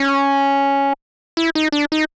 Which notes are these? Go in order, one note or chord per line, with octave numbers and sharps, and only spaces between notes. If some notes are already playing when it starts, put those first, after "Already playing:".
Already playing: C#4
E4
D#4
D4
D#4